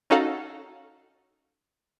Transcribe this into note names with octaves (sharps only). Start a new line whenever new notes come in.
C#4 D#4 F#4 A4 F5 F#5